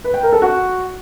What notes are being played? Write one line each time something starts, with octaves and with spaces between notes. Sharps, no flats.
B4
G5
A#4
A4
F#4